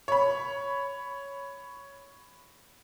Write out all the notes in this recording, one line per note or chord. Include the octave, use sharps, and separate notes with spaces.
C#5 B5